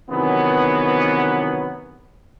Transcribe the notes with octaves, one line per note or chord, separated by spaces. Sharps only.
C3 D#3 E3 F#3 B3